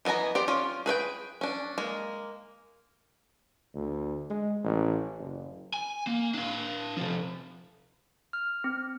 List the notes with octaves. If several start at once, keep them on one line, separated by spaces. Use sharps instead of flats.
E3 B3 D#5 G#5 A#5
G4 C5 D5
C#4 F4
G#4 B4 C#5 G5
C#4 D4
G#3 A#3
D2
G#3
A1
F#1
G#5
A#3
D4 F5
C3 F3
F6
C4